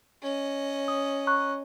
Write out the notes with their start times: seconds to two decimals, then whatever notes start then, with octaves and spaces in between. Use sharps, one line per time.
0.22 C#4 D#5
0.88 D#6
1.27 A#5 C#6 F#6